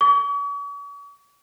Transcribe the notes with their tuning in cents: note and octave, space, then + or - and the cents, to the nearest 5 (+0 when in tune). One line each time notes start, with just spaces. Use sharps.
C#6 +45